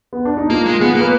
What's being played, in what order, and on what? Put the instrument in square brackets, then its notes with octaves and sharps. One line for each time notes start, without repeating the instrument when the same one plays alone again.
[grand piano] B3
D4
D#4
[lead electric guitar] A#3 [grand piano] F4
[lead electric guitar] G#3
[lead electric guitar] B3 [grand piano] G#4
[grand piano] G#4
[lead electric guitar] A#3
[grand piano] B4